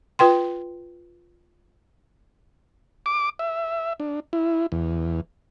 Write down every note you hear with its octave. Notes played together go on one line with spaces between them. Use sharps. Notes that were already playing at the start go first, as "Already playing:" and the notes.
F4 B4 G5 C6
D6
E5
D4
E4
E2